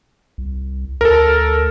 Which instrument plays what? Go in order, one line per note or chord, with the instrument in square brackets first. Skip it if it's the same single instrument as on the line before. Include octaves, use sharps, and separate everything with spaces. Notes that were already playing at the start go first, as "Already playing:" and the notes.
[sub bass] C2
[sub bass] D2 [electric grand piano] A4 A#4